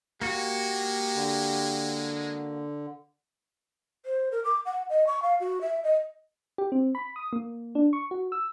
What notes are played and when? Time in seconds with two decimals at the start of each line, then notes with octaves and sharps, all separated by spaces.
0.22 G#3 A#3 F#4 G4
1.15 D3
4.05 C5
4.32 A#4
4.44 D6
4.66 F#5
4.90 D#5
5.07 C#6
5.22 F5
5.40 F#4
5.61 E5
5.84 D#5
6.58 G4
6.72 C4
6.95 B5
7.16 D#6
7.33 A#3
7.75 D4
7.93 C#6
8.11 F#4
8.32 E6